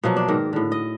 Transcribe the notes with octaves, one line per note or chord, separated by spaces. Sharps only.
B2 F3 F#3 A#3
D4 F#4
G#2 D#3 A#4
A2 D3
D#5